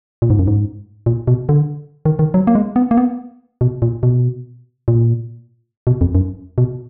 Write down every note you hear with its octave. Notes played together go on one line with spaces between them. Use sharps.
A#2
G#2
F#2
G#2
A#2
B2
D3
D#3
D#3
F#3
A#3
G#3
B3
A#3
B3
B2
A#2
B2
A#2
B2
F2
F#2
B2